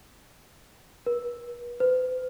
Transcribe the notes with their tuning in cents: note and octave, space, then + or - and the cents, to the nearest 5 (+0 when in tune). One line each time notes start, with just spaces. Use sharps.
B4 -40
B4 +45